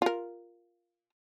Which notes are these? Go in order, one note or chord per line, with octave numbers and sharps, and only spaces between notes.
F4 A#4